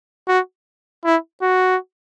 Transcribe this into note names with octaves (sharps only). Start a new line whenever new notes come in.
F#4
E4
F#4